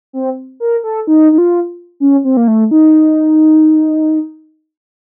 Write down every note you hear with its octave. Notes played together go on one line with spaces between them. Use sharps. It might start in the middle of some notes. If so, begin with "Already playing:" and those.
C4
A#4
A4
D#4
D#4
F4
C#4
C4
A#3
A3
D#4